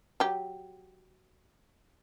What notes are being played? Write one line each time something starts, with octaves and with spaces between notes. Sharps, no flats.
F#3 G4